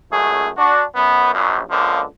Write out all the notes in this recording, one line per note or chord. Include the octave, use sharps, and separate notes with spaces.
C#2 F#2 A3 G#4
D4 F#4
F#2 B3
A#1 F#2
C#2 A#2 D3 F3